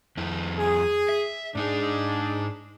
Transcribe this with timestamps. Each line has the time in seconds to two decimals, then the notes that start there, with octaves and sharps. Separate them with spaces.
0.17 F2 E4
0.59 G#4
1.09 E5
1.55 G#2 D4 D#4 G#4